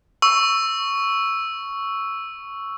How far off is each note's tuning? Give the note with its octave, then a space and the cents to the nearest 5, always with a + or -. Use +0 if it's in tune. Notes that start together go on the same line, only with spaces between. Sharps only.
C#6 +5 E6 +0